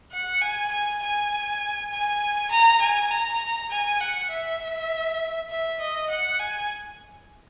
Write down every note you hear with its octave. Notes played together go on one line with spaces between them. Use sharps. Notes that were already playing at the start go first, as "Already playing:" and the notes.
F#5
G#5
G#5
G#5
G#5
A#5
G#5
A#5
G#5
F#5
E5
E5
D#5
F#5
G#5